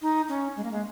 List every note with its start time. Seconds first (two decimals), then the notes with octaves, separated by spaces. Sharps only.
0.02 D#4
0.29 C#4
0.56 G#3
0.63 A#3
0.71 G#3